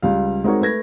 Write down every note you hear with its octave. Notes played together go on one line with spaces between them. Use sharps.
C#2 G3 F5
G#3 C4 D#4 F#4 A#4 C#5
A3 B4 G#6 A#6